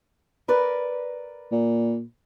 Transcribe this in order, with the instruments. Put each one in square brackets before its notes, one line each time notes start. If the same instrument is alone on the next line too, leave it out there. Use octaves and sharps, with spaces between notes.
[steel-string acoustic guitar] A#4 B4 D5
[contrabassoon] A#2